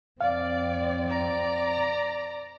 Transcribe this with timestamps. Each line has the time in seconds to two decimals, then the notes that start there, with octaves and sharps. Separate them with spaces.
0.21 F2 C4 D5 F5
1.08 D5 A#5